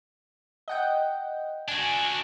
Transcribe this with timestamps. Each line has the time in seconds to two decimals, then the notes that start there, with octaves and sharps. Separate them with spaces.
0.68 D#5 F#5 G5
1.68 D4 F#4 G#5